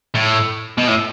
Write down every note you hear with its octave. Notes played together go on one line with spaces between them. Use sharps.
A2
B2
A2